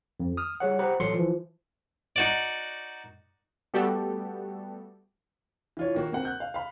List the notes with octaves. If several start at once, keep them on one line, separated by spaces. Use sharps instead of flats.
F2
D#6 F6
G3 G#4 C#5 F#5
G4 C5 F#5 A#5 B5
A1 F#3 A4 C6 C#7
E3 F3
D#4 F#4 D5
G3 A3 B3 F#4 G4 A4
E3 F4 C#5
D#3 A#3 F#4
A#3 C4 F#5
F#6 G6
F5
F5 B5